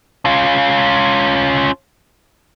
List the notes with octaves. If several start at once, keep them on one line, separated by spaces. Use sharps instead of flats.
C#4 F4